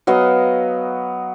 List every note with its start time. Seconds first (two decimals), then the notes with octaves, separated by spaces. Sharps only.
0.07 F#3 B3 D#5 F5